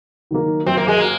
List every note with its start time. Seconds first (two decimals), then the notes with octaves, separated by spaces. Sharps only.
0.31 D#3 F#3 A#3
0.66 F#2 C4
0.77 A#3
0.88 G#3
0.98 A#3 F#4